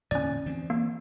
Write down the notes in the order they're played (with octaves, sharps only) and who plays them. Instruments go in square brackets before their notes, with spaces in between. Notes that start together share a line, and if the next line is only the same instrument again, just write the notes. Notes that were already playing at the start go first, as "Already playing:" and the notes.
[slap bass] E2 A#2 D3 [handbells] C#4 D5
[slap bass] D2 E3 C4
[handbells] A#3